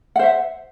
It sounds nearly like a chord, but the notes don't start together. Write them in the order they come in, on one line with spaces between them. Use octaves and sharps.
F#5 C5 E5